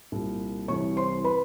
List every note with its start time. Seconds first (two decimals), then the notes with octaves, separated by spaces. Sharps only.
0.12 C2 A#2
0.68 C2 C3 E3 C#5 C#6
0.97 C5 C6
1.24 B4 B5